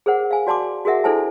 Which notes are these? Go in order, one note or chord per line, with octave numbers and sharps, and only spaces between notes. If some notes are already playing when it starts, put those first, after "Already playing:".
G#4 A#4 C5 F#5
F5 G#5
F#4 D5 A5 C6 D6
F#4 G#4 A#4 E5 F#5
D4 E4 A4 C5 G#5 A5